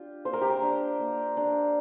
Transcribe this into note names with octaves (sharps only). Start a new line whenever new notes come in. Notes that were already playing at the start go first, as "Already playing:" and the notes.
Already playing: D4 F4 G4
A#3 C5
A#4
G4
A#4
D4
A#3
D4